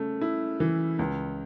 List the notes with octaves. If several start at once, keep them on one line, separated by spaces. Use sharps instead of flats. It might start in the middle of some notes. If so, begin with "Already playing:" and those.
Already playing: C#3 A3
E4
E3
C#2